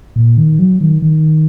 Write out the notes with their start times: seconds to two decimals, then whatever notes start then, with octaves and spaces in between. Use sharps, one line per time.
0.16 A#2
0.37 D#3
0.59 F#3
0.81 D#3
1.02 D#3